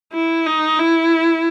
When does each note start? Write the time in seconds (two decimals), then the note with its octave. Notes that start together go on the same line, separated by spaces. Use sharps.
0.13 E4
0.46 D#4
0.78 E4